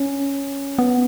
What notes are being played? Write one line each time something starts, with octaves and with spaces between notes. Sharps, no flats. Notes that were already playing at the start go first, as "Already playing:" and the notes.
Already playing: C#4
B3